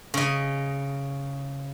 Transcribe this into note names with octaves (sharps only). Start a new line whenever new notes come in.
C#3 D#5